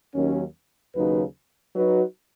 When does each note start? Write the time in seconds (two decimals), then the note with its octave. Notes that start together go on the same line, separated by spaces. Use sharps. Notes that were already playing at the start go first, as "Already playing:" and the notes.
0.15 D#2 D#3 F#3 C#4
0.94 D#2 C#3 F#3 D#4 B4
1.74 F#3 D#4 F#4 B4